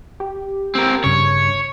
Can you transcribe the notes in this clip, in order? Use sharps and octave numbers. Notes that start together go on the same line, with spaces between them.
G4
C4 A#4
G2 C#3 C#5